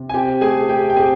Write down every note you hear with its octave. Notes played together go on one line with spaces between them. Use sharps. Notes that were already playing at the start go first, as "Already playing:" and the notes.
Already playing: C3
G#5
C4 G4 G5
A3 G#4 G#5
A3 G4 G5
G5
C4 G#4 G#5